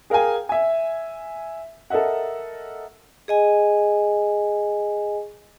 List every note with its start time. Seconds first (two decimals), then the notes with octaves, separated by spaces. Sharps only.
0.10 G#4 A#4 F5 G5 G#5
0.49 E5 G#5
1.90 A4 A#4 D#5 E5 F#5
3.28 G#4 D#5 G#5